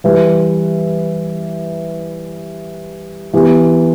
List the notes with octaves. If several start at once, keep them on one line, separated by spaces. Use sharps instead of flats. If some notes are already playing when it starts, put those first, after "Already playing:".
E3 G3 E4 B4
E3 B3 G4